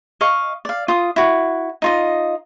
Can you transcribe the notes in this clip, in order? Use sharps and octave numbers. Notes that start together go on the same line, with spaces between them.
D#5 F5 C#6
D5 F5
F4 D#6
E4 F#4
D#4 F4 D#5